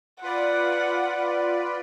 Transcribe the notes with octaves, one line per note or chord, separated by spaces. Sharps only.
F4 B4 D5 F#5